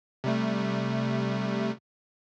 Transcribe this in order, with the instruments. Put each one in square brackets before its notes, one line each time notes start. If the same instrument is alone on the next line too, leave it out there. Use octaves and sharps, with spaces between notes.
[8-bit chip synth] C3 G3 A3